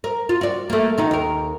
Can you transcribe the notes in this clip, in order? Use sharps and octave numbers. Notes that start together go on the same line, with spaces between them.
A#4
F4
F#4 D5
A3 A#3
D#3 D#4 F#4
D#2 A#4